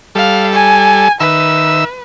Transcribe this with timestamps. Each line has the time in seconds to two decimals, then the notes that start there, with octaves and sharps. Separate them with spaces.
0.15 G3 A4 F5
0.52 G#5
1.20 D#3 B4 E5 E6